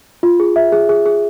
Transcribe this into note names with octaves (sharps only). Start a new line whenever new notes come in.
F4
G#4
E5
G#4
G#4
G#4